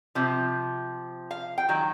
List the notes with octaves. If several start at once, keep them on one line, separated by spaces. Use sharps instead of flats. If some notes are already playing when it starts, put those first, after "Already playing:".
C3 F3
F5
G5
D#3 F#3